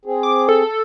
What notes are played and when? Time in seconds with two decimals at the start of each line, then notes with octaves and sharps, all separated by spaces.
0.05 C4 G#4
0.23 D6
0.49 A4